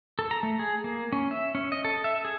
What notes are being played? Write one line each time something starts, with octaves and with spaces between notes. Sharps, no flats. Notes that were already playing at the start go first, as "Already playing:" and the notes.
A4
A#5
A3
G#4
A#3
C#4
E5
C#4
D#5
A4
E5
G#4